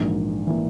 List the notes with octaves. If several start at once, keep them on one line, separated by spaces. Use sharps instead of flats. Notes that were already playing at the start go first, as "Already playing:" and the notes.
Already playing: A#1 G#2 E3 A#3
E3 A#3